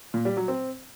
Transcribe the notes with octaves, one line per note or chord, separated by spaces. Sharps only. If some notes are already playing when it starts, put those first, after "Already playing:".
A#2
G3
F#3
C4